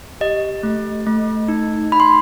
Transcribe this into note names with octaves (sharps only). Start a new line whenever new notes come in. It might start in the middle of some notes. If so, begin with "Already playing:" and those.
G4 D#5
A3
A3
D#4
D#4 B5
C6